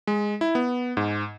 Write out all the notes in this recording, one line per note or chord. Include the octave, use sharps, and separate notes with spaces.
G#3
E4
B3
G#2